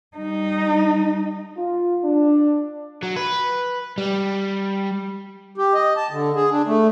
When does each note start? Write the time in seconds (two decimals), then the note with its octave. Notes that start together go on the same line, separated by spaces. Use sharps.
0.17 G3 D#4
1.57 F4
2.04 D4
3.03 F#3
3.16 B4
3.98 G3
5.58 G4
5.74 D#5
5.97 A5
6.11 D3
6.35 G#4
6.51 D4
6.67 A3